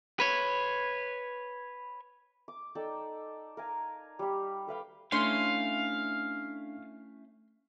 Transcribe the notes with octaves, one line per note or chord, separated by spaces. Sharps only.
B4 C#5
D6
D#4 A4 D5 G5
A#4 F5 G#5
G3 G4
A4 B4 F5 G5
A3 C#4 D4 E4 F5 C6